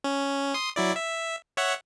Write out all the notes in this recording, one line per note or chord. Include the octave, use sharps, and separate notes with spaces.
C#4
C6 D#6
F#3 E4 D5
E5
C#5 E5 F#5